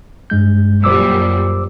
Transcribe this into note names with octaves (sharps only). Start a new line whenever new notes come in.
G2 G#3 G6
F#2 A#2 G3 C5 D6 E6